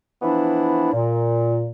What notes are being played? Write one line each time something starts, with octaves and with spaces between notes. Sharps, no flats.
E3 F3 B3 D4 E4
A#2